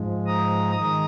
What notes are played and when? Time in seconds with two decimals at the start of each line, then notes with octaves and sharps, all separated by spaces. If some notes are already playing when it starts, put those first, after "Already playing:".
Already playing: G#2 F3 G#3
0.26 A#5 D#6
0.75 D#3 G#3 A#5 D#6